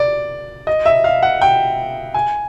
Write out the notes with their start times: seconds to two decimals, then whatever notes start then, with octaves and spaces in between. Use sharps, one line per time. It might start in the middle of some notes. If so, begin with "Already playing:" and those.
Already playing: D5
0.67 D#5
0.85 E5
1.04 F5
1.23 F#5
1.41 G5
2.14 G#5